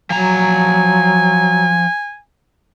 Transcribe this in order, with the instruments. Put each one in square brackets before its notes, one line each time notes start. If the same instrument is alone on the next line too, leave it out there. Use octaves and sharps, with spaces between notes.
[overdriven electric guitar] F3 A#5 [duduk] F#3 [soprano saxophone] G#5